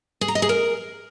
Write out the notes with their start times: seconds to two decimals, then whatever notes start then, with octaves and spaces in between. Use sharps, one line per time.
0.21 G#4
0.28 A#5
0.35 D#5
0.42 G#4
0.49 A#4